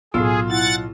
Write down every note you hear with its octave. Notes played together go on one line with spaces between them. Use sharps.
B1 A2 B3 F4 G#4 E6
E4 F#5 A6